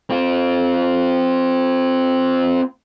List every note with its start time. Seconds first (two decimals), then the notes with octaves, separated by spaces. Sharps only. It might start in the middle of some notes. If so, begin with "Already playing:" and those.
0.10 C4 F4